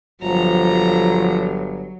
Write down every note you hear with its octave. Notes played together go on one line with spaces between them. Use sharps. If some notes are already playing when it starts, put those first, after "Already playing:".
G1 F3 F#3 A4 A#5